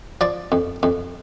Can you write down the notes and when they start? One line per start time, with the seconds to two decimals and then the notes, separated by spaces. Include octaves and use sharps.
0.21 F3 D5
0.52 F2
0.83 F2